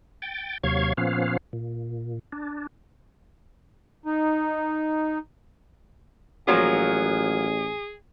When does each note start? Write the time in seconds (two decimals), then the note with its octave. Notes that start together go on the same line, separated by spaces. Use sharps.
0.22 G5 A6
0.64 D#2 C3 F#3 F5 C#6 G#6
0.97 A#2 F3 B3 C#4 F5
1.53 A#2
2.32 D4
4.06 D#4
6.48 A1 F3 F#3 A#3 G#4